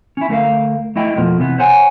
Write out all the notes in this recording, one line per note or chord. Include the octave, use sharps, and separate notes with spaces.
C#4 E4
D2 A3 A#4 F5
A3 E4 D#5 G5
F2 B2 F3 A#3
C3 E3 B3
C5 C#5 F#5 G#5